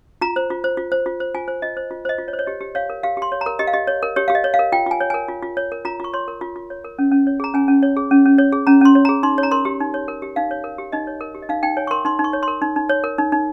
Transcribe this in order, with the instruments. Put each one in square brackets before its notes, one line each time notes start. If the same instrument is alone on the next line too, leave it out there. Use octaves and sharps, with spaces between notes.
[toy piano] F4 A#5
C5
F4
C5
F4
C5
F4
C5
F4 G#5
C5
F4 D#5
C5
F4
C5 D#5
F4
C#5
C5
C#5
G4 D#5
G4
C#5 F5
A#4
G4 F5
G4 C6
C#5
A#5
A#4
G4 D#5
F5
G4 D#5
C#5
A#4
G4 C#5
G4 F5
D#5
C#5
F5
A#4
F4 G5
F4 G#5
C#5
A#4 G#5
F4
F4
C#5
A#4
F4 A#5
F4 C#6
C#5 C6
A#4
F4
F4
C#5
A#4
C#4
C#4
C#5
G#4 A#5
C#4 G#5
C#4
C#5
G#4
C#4
C#4
C#5
G#4
C#4 A#5
C#4 C6
C#5
G#4 A#5
D#4 C6
C#5
A#5
A#4 C6
G4
D#4
C#5
A#4
G4
D#4 F5
C#5
A#4
G4
D#4 D#5
C#5
A#4
G4
D#5
D#4 F5
D#4 G5
C#5 G#5
C#6
A#4 C6
D#4 C6
D#4
C#6
C#5
A#4 C6
D#4
D#4
C#5
A#4
D#4
D#4